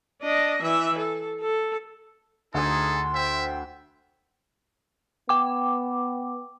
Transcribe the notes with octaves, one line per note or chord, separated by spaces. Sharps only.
D4 D#5
E3 E5
A4
A4
D2 D#4 G#4 A4 F#5 C6
C5 E5 G5
B3 G5 D6